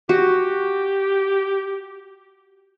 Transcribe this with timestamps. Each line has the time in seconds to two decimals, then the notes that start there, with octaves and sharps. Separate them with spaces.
0.09 F#4 G4